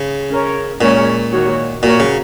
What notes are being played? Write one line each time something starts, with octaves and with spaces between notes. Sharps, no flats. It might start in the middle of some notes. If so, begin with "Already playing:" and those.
Already playing: C#3
C#4 A#4 C#5
A#2 G#3 C#4 A#4 C#5
D#3 A#3 F#4 C#5
A#2 A#3 F#4 A#4 C#5
C#3